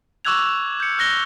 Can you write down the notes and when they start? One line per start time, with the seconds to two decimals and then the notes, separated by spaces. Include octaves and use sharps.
0.25 C#6 D6 E6 F#6 G#6 F7
0.80 G6 C#7
0.98 F6 F#6 A#6 G7